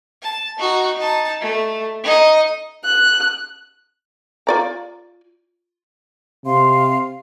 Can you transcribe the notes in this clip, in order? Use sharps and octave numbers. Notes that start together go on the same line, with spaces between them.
A5
D#4 F#4
D#4 A5
A3
D#4 D#5
F#6
F4 D5 A#5
C3 F5 C6